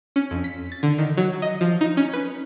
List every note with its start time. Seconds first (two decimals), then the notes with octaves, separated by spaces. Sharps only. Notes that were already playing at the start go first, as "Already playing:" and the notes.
0.16 C#4
0.31 F2
0.44 B6
0.72 A6
0.83 D3
0.98 D#3
1.17 F#3
1.42 D#5
1.61 F3
1.81 D#4
1.97 C#4
2.13 B4